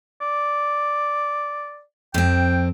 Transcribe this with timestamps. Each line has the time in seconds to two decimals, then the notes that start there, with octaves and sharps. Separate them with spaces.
0.21 D5
2.14 F2 C4 G5